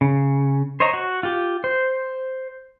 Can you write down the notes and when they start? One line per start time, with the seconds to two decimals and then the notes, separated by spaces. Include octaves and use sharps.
0.01 C#3
0.80 C5 C#5 D#5 A#5
0.94 F#4
1.23 F4 G4
1.64 C5